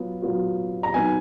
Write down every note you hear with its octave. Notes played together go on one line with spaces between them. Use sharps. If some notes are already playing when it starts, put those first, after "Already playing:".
Already playing: F#3 B3 F4
F#3 B3 F4
A#5
F#3 B3 D#4 G#5